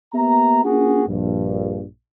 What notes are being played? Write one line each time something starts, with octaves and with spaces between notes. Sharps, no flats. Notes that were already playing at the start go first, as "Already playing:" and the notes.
A#3 B3 G4 E5 A#5
A#3 C#4 D4 F4 F#4 G#4
A#1 G2